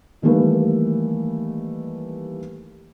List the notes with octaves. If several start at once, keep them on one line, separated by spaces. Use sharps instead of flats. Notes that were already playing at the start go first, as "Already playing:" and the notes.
D#3 E3 G3 A3 A#3 B4